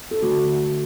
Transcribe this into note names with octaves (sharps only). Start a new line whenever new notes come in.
A4
D3 A3 F#4